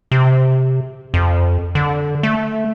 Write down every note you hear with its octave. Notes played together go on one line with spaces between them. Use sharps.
C3
F2
D3
A3